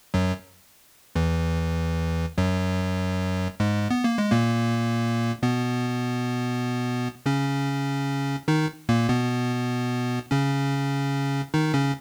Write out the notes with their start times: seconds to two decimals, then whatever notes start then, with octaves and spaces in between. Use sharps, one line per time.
0.14 F#2 F#3
1.16 E2 E3
2.38 F#2 F#3
3.60 G#2 G#3
3.91 B3
4.04 A#3
4.18 G#3
4.32 A#2 A#3
5.43 B2 B3
7.26 C#3 C#4
8.48 D#3 D#4
8.89 A#2 A#3
9.09 B2 B3
10.31 C#3 C#4
11.54 D#3 D#4
11.74 C#3 C#4